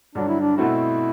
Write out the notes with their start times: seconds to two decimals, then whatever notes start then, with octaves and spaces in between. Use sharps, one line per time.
0.15 G2 D3 F#3 D4
0.28 E4
0.41 D4
0.57 B2 A3 C4 E4 F#4